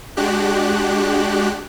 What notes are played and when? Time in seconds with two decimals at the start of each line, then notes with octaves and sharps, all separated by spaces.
0.17 G#3 D4 F#4 G4 F#6